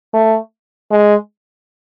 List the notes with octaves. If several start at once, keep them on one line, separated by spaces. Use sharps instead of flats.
A3
G#3